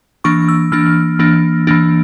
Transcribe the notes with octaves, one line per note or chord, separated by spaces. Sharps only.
E3 A#3 D4 C#6
E6
E3 A#3 D4 F6
E3 A#3 D4
E3 A#3 D4